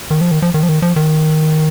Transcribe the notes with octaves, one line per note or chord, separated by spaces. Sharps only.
D#3
F3
D#3
F3
D#3
F3
D#3
F3
D#3